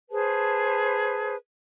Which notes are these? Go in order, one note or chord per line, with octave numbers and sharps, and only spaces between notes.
G#4 B4 C5 A5